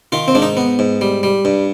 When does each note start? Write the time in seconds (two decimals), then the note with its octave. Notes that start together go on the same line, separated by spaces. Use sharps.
0.12 D#3 F4
0.28 C4
0.35 G#2 D4
0.42 D#4
0.57 B3
0.79 G#2
1.01 G3
1.23 G3
1.45 G2